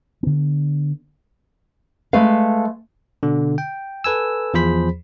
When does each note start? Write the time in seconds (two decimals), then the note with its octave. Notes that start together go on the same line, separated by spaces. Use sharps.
0.23 D3 B3
2.13 G#3 A3 B4 F5
3.23 B2 D3
3.58 G5
4.04 A4 B4 G#5 E6
4.54 E2 F3 G#4 C5 B5 B6